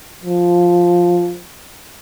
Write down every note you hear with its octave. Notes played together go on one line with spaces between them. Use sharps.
F3